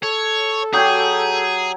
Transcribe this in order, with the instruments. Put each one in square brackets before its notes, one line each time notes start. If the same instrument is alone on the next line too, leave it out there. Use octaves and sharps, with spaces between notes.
[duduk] A4 [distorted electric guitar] C#5
[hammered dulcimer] F#3 G4 G#5 [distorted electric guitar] G#4 [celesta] D#6 G6